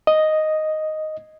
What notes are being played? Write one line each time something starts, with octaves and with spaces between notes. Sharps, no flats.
D#5